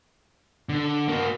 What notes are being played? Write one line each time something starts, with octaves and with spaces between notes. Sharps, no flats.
D3
A#3 F#4